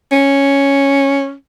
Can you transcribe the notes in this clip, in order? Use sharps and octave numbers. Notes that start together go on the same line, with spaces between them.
C#4